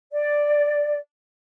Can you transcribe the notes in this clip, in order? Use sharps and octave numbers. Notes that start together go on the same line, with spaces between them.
D5